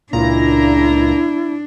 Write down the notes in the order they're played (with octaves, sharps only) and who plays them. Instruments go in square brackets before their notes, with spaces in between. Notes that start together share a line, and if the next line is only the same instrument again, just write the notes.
[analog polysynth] C#2 A#2 A#5 [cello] D4 [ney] E4